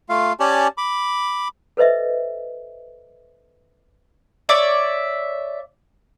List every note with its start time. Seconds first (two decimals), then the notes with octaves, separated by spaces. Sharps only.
0.09 A3 F4 F5
0.40 C#4 G4 C#5 D5 G#5 A5
0.78 B5 D6
1.77 A4 B4 C5 D#5 E5
4.49 C#5 D5 E5